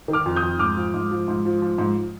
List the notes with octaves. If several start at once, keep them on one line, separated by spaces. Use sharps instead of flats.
D#3
D6 F6
F2
D#6 G6
F2
G#2 D6 F6
F3
G#2
F3
G#2
F3
F3
G#2